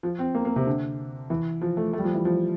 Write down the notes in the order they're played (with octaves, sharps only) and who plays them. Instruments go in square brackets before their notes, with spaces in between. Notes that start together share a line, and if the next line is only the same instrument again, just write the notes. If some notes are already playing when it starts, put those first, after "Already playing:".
[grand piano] F3
C4
A#3
A#3
C3
D3
E3
F3
A3
A3
G3
F3
E3
F3